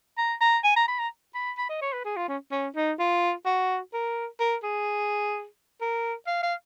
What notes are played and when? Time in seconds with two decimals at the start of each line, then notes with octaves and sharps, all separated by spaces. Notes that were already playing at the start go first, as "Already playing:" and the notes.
0.18 A#5
0.41 A#5
0.64 G#5
0.76 A#5
0.88 B5
0.99 A#5
1.35 B5
1.58 B5
1.69 D#5
1.82 C#5
1.93 B4
2.05 G#4
2.16 F4
2.29 C#4
2.51 C#4
2.76 D#4
2.99 F4
3.46 F#4
3.93 A#4
4.40 A#4
4.63 G#4
5.81 A#4
6.27 F5
6.43 F5